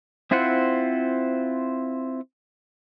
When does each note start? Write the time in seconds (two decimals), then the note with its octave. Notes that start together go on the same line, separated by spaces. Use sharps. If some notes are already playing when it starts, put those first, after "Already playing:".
0.31 C4 E4 F4 C5 F#5